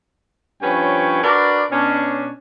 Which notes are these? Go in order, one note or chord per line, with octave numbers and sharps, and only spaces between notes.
G2 F3 C#4 B4 C#5 G5
D4 F#4 A#4 B4 D5
B2 C#4 D4